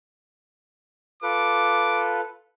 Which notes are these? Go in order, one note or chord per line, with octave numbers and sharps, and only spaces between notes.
F4 A4 B4 D6